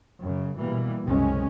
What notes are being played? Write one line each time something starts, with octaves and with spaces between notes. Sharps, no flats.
F#2 C#3
B2 E3 G3 A#3
F#1 C2 G#3 C#4